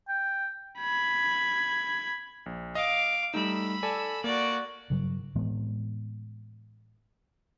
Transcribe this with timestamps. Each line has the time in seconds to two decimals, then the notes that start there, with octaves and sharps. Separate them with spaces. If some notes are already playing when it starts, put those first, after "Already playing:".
0.09 G5
0.80 B5 G#6
2.46 A#1
2.75 D#5 F5 D6
3.34 G3 A3 D#4 B5 E6
3.83 A4 D5 G#5
4.24 A#3 F#4 D5
4.90 G2 C#3 F#3
5.35 A2 E3 G#3 B3